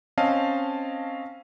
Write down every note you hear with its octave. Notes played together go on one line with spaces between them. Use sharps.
C4 C#4 D#5 F5 A5